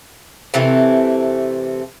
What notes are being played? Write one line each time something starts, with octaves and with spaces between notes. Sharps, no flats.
C3 E3 A3 C4